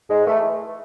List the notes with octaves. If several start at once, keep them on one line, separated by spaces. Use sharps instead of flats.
G#2 G#3
E3 A3